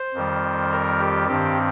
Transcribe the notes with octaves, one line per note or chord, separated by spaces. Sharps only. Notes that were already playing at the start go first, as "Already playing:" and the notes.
Already playing: C5
F2 D#3 G3
A#4
G4
G2 D#3 C4 G4